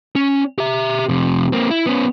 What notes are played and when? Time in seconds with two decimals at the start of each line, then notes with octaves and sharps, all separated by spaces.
0.15 C#4
0.58 G4 E5
1.09 F2 C3
1.52 A#3 C4
1.70 E4
1.86 B3 C#4